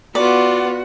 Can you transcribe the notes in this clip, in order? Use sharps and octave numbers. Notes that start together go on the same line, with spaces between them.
B3 F4 F#4 D5 F#5